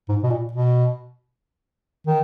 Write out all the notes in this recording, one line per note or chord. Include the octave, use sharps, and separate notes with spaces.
G#2
B2
A#2
B2
D#3